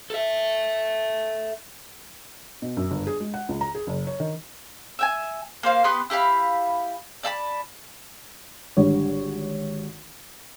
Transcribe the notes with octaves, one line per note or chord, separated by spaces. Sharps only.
A4 E5
B2
F#2
G1
G#4
G#3
F#5
C#2
A#5
G#4
F#1
C#5
D#3
E5 G5 G#5
A#3 C5 F5
B3 G4 B4 C6
E4 G4 F5 B5
D5 E5 A5 B5
G#1 D3 G3 C#5